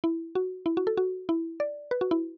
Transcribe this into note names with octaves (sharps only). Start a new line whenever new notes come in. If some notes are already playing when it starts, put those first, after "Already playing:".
E4
F#4
E4
F#4
A4
F#4
E4
D5
B4
F#4
E4